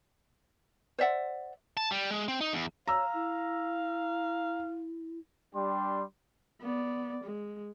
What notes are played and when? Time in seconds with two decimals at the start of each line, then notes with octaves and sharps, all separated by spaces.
0.98 C5 D5 E5 F#5
1.77 A5
1.91 G3
2.11 G#3
2.28 C4
2.41 D#4
2.53 E2
2.87 C#5 F5 A#5 E6
3.14 E4
5.54 G3 D4 G4 C6
6.61 B3 D5
7.24 G#3